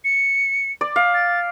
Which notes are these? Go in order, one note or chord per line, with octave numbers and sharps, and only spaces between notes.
C#7
D5
F5
A6